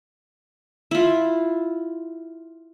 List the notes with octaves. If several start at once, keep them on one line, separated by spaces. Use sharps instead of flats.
E4 F4